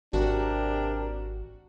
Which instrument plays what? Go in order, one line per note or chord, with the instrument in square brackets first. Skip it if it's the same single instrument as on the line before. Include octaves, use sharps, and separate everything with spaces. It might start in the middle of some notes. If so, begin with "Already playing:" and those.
[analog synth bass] G#1 [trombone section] C3 G4 A#4 [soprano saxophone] D4 [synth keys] F#4